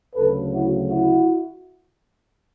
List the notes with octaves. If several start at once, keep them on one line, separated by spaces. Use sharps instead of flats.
D2 C#3 F#3 A4 B4
E4 F#4
E4 F#4